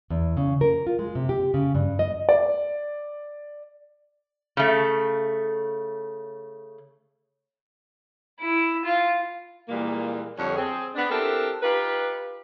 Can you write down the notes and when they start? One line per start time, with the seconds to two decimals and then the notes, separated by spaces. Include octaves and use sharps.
0.10 E2
0.37 C#3
0.61 A#4
0.87 F4
0.99 G#3
1.15 C3
1.29 G4
1.54 C#3
1.75 G2
1.99 D#5
2.29 D5
4.57 C#3 A3
8.40 E4
8.85 F4
9.68 A#2 E3 G3 G#3 A#3
10.36 F2 D3 G3 C#5
10.55 C4 G#4
10.95 B3 D4
11.09 C4 D4 E4 G4 A4 A#4
11.61 D#4 F4 G4 B4